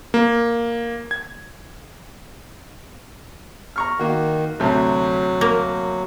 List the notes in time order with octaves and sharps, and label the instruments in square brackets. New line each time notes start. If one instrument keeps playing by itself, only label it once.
[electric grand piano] A#3
G#6
[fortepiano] A#5 C#6 F6
[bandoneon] D#3 [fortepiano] A#3 F#4
[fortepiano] D2 C3 [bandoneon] F#3
[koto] A#3